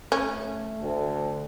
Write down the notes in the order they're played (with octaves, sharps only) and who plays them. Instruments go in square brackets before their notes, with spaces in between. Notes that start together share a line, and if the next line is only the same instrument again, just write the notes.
[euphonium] A3 [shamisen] C#4
[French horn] D2